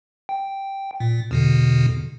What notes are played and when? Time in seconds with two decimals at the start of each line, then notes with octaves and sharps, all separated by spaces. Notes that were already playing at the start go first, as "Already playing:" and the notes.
0.29 G5
1.00 A#2
1.31 E2 B2 D3